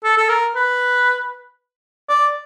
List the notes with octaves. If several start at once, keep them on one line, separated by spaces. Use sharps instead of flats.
A4
A4
A#4
B4
D5